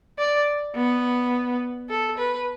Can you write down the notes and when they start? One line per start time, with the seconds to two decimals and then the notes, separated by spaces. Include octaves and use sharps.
0.19 D5
0.75 B3
1.89 A4
2.18 B4